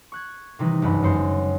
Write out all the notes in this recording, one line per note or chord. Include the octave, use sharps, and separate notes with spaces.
C#6 F#6 G#6
C3 D#3 E3 G3 D#4 B4
F#1 C#2 G2 F#5 B5
F#2 G#3 C#4 C5 C6 C#7